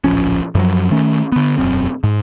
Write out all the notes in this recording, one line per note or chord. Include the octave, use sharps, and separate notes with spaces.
D1 A#1 F3 C#4
F#2 F3 F#3
D#3 A3 C#4
D3 B3
E1 F#2 C4
G#2